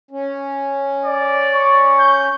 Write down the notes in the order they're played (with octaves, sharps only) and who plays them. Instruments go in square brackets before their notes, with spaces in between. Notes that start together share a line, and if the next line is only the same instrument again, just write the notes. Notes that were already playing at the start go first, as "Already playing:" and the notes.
[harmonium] C#4
[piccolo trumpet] D5
[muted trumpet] C#6
[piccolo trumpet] G6